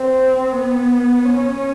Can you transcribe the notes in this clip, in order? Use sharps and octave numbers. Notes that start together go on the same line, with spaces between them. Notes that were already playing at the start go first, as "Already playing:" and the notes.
Already playing: C4
B3
C#4